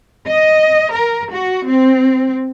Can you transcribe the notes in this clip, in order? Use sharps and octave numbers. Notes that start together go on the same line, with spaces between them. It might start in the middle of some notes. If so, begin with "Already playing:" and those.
D#5
A#4
F#4
C4